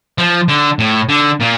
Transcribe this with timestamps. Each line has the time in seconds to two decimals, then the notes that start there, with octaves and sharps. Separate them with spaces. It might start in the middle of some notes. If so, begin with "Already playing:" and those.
0.18 F3
0.48 D3
0.79 A2
1.09 D3
1.40 A#2